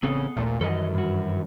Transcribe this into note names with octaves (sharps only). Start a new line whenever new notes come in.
A1 C#3 B3 C4 G#4 A4
A#1 D#2 A#2 A3
F#2 D#3 E3 G3 A4 D#5
G2 F#4